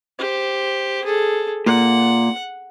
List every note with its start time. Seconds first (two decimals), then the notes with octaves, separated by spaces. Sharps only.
0.19 G4 C5
1.05 G#4 A4
1.66 A#2 F#5